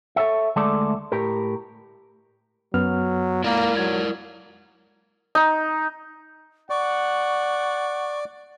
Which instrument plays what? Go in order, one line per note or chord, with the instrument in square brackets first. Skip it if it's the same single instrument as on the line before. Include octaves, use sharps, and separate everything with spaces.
[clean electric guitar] A4 C#5 E5
D2 G#3 A3 A4 D5
A2 G4 A#4
[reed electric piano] F#2 B3 F6 [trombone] F#3
[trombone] A#3 [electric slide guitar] E4 A#4 D5
[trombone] F#3 [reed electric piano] G#6
[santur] D#4
[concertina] D5 [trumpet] F#5 [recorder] C#6